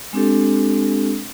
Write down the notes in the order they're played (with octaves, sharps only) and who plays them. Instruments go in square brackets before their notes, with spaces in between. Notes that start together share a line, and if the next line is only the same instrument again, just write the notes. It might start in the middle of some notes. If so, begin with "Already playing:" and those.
[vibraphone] G#3 C4 D4 G4 A4